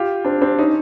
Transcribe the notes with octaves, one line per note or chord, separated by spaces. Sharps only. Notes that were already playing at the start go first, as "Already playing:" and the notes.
Already playing: F4 G4
C4 D4
C4 D4
C#4 D#4